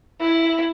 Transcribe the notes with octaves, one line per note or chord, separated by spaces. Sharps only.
E4